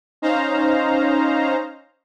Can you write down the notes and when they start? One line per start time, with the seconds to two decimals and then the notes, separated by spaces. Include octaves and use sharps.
0.22 C#4 D#4 C5 F5 A#5